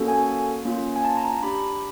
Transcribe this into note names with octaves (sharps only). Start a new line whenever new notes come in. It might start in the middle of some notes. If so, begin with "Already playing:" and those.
Already playing: A#3 C#4 F#4 A4
G#5
A#3 C#4 F4
G#5
A5
A#5
A#5
D4 G4 B5